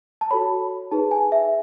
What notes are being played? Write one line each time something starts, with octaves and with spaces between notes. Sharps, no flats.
A5
F#4 A4 C#5 B5
D#4 G#4 B4 A5
G#5
E5